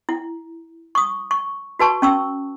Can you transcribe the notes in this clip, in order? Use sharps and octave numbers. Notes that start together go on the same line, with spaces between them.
E4
C#6 D#6
C#6
F#4 B4 A5 C#6
C#4 C#6 E6